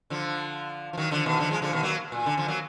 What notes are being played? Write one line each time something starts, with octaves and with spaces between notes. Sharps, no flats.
D3 F3
F3
D#3 F#3
D3 F3
B2 D#3
D3 F3
F3 G#3
D3 F3
B2 D#3
F#3 A#3
A#2
D3
D3 F3
F#3 A#3